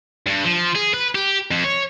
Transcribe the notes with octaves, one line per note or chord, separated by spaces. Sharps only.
G2
F3
G#4
B4
G4
F2
C#5